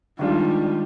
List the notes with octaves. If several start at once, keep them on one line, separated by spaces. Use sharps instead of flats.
D#3 G3 G#3 D4 F4